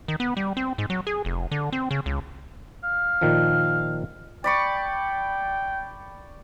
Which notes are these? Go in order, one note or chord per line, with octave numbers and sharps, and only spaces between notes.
D#3
B3
G3
C4
G#2
F#3
G#4
F1
D3
C4
C#3
C#2
F5
A#2 D#3 F3
D5 G5 B5 C#6